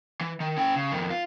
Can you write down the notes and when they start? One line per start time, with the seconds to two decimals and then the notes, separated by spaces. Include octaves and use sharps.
0.21 E3
0.40 D#3
0.58 C#4 G5
0.76 C#3
0.92 F2 D#3
1.10 F4